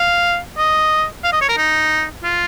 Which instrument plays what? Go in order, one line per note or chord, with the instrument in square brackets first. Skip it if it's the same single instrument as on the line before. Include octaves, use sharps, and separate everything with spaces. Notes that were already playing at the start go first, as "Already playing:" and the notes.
Already playing: [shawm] F5
D#5
F5
D#5
C#5
A#4
D#4
F4